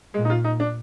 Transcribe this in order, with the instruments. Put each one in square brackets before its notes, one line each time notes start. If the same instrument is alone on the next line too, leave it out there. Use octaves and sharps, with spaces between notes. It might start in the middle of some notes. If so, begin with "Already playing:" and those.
[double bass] A#2 [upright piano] G#3
[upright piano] D#4
F4
D#4
D4